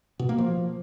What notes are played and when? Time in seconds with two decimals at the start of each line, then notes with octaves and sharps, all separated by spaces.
0.19 B2
0.29 A#3
0.38 F3